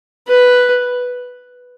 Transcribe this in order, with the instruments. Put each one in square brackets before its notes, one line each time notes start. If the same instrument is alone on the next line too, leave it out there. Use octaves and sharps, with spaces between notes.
[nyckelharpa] B4